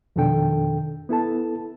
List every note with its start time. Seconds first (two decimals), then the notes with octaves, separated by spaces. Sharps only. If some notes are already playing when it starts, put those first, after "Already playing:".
0.16 F2 B2 D#3 D4 A4 G5
1.09 B3 E4 A4 A5